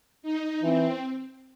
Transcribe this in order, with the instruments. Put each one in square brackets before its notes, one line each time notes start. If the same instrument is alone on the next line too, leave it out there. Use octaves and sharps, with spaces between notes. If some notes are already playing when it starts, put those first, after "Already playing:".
[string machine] D#4
[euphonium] E3 [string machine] C4